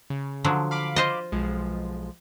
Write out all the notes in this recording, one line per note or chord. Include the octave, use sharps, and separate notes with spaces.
C#3
D3 F3 F#3
F5 B5 D6
F4 C5 D#5
B1 F3 G#3